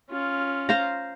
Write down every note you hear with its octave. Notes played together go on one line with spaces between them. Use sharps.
C#4 F4
C5 F5 A#5